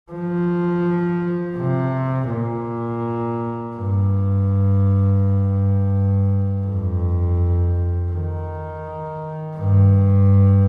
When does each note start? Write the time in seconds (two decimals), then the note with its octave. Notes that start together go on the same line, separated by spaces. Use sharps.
0.12 F3
1.57 C3
2.30 A#2
3.76 G2
6.66 F2
8.12 D#3
9.57 G2